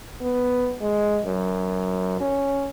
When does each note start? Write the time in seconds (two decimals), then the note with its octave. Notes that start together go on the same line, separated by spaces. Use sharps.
0.21 B3
0.81 G#3
1.25 F#2
2.20 C#4